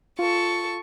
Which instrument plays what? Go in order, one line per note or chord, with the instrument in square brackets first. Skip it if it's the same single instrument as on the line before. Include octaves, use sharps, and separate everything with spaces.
[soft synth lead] F4 [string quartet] A4 C#6